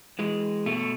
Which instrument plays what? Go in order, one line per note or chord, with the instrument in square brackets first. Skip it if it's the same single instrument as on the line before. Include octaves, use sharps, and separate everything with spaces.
[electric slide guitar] E3 G#3
B2 A3